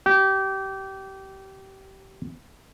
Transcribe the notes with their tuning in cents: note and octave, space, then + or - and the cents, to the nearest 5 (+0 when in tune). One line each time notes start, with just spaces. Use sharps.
G4 -25